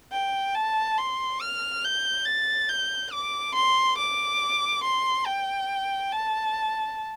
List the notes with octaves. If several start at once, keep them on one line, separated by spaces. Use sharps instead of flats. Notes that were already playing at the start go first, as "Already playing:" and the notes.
G5
A5
C6
F6
G6
A6
G6
D6
C6
D6
C6
G5
A5